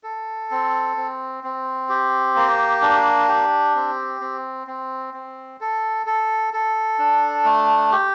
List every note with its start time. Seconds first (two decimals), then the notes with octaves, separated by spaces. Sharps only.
0.03 A4
0.51 C4
0.97 C4
1.44 C4
1.89 G4
2.36 A#3
2.82 D4
3.28 G4
3.75 C4
4.21 C4
4.67 C4
5.14 C4
5.61 A4
6.06 A4
6.53 A4
6.99 D4
7.45 A3
7.92 G4